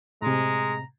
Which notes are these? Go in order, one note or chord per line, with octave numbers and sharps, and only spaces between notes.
A2 C3 G#3 A#5